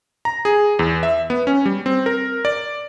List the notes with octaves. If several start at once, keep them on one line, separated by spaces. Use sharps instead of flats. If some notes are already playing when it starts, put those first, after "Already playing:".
A#5
G#4
E2
E5
B3
C#4
G3
C4
A#4
D5